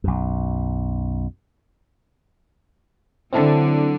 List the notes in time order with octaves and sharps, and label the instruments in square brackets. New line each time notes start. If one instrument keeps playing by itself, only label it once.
[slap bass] B1 F#2
[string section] D3 F#3 [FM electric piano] C4 E4 A4